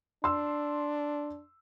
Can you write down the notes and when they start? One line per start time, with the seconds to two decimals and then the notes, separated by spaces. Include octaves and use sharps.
0.24 D4 C6 E6